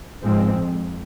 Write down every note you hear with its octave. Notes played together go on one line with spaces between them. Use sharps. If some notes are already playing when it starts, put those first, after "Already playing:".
G#2 F3 G#3 C4
F2